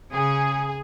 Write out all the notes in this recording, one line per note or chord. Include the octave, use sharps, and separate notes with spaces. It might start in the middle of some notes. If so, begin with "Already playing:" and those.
C#3 G#4